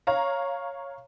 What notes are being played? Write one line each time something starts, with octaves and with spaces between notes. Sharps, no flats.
C#5 F5 A#5